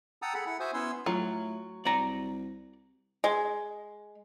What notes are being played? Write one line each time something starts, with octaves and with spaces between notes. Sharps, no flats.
F#5 G5 A5 A#5 D#6 E6
G#4 A4 F#5 B5
E4 F#5
F#4 C5 E5 G#5 D#6
B3 C#4 E4 C#5 C6 E6
A2 F#3 F4
C2 D5 G5 A#5
G#3